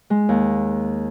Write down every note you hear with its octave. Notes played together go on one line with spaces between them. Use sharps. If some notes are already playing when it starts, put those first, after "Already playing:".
G#3
D#2